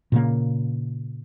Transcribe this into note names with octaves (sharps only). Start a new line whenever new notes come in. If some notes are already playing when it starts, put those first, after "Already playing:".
A#2 C#3 A#3